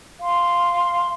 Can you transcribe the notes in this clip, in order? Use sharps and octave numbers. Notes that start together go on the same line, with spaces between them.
F5 C6